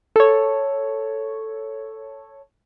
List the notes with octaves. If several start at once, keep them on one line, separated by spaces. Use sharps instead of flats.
A4 C#5